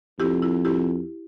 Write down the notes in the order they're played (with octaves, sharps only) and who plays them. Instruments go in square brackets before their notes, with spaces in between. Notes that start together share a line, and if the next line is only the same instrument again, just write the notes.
[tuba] F2 [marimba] E4 G4
[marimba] E4
E4 G4